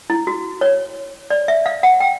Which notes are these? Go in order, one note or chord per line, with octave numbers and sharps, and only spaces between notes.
E4
F#4
C#5
D5
E5
F5
F#5
G5